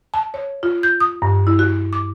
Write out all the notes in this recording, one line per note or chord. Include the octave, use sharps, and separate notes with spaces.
A5
C#5
F4
G6
D#6
G2
E4
F#4
D6